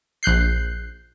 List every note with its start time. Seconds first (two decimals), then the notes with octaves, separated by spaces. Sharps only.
0.23 A#1 F#6 G6 C7